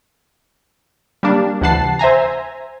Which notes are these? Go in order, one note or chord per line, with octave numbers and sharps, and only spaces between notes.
G3 A#3 D4
D2 C3 E3 F#5 A5 C7
C5 E5 G#5 A#5